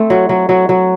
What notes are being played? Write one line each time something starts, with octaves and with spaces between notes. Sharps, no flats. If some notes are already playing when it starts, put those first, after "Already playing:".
Already playing: A3 C4
F#3
F#3
F#3
F#3